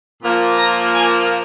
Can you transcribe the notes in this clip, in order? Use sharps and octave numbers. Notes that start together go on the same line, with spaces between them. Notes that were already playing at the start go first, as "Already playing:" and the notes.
A#2 F3 A#3
A#5
G#5